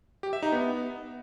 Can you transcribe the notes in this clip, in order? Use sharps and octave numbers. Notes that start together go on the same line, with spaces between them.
G4
E5
D#4
B3